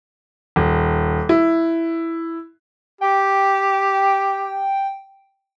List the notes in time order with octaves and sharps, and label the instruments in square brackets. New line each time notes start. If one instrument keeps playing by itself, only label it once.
[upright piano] D#1
E4
[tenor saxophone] G4 [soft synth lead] G5